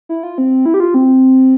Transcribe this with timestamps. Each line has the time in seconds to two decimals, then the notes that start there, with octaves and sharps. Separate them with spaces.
0.09 E4
0.23 F4
0.38 C4
0.66 E4
0.74 G4
0.80 F4
0.94 C4